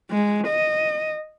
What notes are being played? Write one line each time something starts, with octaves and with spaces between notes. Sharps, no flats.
G#3
D#5